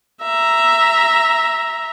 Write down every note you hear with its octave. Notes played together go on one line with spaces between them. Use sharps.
E5 A#5